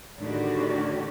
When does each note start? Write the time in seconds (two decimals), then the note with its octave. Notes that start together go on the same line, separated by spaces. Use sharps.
0.18 A2 D3 D#3 D4 F#4 G4